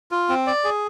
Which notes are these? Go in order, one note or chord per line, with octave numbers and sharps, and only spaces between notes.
F4
C4
D5
G#4